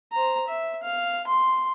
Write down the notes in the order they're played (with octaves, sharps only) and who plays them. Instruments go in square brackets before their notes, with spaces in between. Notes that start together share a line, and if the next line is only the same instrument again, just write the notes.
[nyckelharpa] C5 A#5
E5
F5
C6